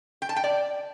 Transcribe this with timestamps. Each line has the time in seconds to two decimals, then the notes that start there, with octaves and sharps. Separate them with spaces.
0.22 G5
0.29 A5
0.36 G5
0.44 D5